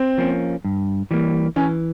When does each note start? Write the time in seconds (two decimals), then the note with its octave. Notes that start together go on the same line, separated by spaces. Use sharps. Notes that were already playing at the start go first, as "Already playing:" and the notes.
Already playing: C4
0.18 F3 A#3 C#4
0.65 G2
1.11 E3 G3 A#3
1.56 E3 C#4